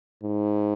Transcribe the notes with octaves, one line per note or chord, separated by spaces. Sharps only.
G#2